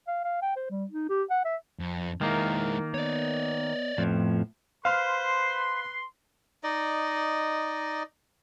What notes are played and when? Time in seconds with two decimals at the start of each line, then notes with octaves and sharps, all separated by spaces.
0.07 F5
0.24 F5
0.42 G5
0.56 C5
0.70 G3
0.91 D#4
1.09 G4
1.30 F#5
1.45 E5
1.80 F2
2.21 D#3 G#3 A#3 E4
2.94 B3 C#5 D5
3.98 F2 A2 F3 B3
4.85 B4 C5 F5 C6 F6
6.64 D#4 D5 D#5